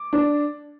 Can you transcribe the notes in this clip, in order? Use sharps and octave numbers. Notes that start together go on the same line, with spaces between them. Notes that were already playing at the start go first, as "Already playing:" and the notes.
Already playing: D6
D4